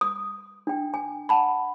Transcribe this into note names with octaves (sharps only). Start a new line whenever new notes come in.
D#6
D4 G5
G#5
F#5 A5 B5